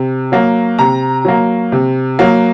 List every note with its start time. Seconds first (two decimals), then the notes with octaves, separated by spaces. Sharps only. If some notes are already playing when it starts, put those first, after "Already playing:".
Already playing: C3
0.32 F#3 A#3
0.79 C3 A#5
1.25 F#3 A#3
1.72 C3
2.19 F#3 A#3